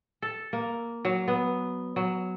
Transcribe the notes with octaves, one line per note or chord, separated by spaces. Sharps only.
A4
A#3
F#3
B3
F#3